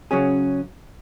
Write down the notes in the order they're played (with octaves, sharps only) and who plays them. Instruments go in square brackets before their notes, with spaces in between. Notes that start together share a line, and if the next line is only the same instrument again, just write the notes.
[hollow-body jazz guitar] C#3 F#3 C#4 G#4